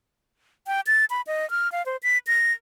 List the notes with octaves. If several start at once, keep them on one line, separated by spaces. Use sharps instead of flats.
G5
A6
B5
D#5
F6
F5
C5
B6
A#6